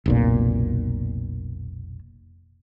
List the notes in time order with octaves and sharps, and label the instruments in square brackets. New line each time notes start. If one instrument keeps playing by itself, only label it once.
[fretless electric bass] F1 B1 A#2